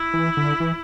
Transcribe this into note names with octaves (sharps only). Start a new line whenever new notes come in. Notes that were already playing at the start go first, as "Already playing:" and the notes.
Already playing: E4
E3
D3
E3